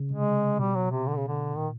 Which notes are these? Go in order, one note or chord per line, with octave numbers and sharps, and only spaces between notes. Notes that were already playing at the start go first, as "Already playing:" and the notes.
Already playing: C#3
C3 G#3
B2 G3
F#3
C3
D3
C#3
D3
A#2 D#3